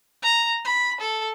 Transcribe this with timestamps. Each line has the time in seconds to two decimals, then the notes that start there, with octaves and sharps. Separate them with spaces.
0.22 A#5
0.65 B5
1.01 A4